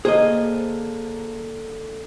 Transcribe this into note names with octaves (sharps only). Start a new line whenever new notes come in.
D3 A#3 G#4 C5 D#5